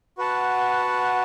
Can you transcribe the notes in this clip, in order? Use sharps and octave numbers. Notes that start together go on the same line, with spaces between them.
F#4 B4 F#5 A5